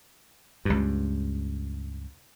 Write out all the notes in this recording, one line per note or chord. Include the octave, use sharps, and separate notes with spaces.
C#2 G2